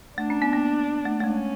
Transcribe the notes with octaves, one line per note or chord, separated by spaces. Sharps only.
A3 D4
C#4
B3
A#3
A3
A3
G#3 C#4